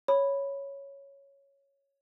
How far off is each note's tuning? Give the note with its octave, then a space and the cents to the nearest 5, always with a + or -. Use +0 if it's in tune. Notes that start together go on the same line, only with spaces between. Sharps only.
C#5 +0 B5 +0